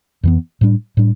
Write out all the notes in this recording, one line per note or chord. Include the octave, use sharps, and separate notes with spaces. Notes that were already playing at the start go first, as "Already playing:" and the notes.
F2 E3 B3
A2 G3 D4
A2 G3 D4